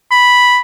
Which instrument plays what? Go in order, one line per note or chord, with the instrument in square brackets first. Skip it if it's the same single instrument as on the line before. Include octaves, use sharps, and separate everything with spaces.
[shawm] B5